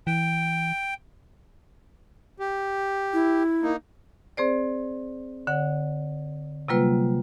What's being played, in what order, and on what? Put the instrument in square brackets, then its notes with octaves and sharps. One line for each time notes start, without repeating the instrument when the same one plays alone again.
[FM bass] E3 [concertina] G5
[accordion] G4
[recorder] E4
[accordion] A#3 D#4
[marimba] C4 G#4 C5 D5
D3 C#5 F#5
C3 F#3 G3 A#3 F4 B4